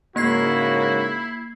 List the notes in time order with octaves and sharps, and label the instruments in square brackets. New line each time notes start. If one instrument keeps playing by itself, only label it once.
[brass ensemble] G#2 C#3 A#4 [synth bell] A#3 G#6 C7 [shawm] E4 [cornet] F#4